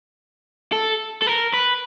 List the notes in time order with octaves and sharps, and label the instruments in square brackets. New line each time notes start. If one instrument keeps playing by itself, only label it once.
[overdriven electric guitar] A4
A4
A#4
B4